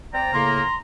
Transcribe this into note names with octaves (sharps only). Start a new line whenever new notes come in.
C4 D5 G5 A#5
A2 C#3 A#3 C6